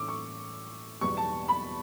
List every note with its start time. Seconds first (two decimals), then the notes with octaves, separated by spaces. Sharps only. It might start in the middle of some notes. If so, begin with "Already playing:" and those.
Already playing: A2 E3 C#4 D6 E6
0.08 C#6
1.01 E2 B2 G3 B3 C#6
1.17 A5
1.48 B5